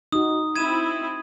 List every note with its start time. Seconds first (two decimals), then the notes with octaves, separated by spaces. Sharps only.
0.12 D#4 F#4 D#6
0.56 C4 E4 G#6 D#7 E7